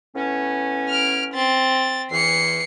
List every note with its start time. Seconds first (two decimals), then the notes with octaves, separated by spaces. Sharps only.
0.15 A2 B3 C#4
0.89 F6 D7
1.34 C4 A6
2.11 E2 E3 C7 C#7